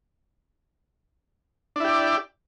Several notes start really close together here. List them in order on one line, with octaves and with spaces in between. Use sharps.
D4 E4 G4 D5